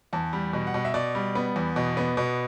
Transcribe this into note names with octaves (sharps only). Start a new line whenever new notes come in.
E2 A5
G3
B2
F#5
B2
E5
B2 D5
G3
B3
E2
B2
B3
B2